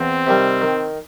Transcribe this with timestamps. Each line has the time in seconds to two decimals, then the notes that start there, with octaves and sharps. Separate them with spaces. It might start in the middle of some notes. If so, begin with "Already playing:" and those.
Already playing: E2 C4
0.27 C3 D#3 G3
0.61 D#3